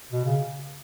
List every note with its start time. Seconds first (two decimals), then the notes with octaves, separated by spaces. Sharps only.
0.12 B2
0.25 C#3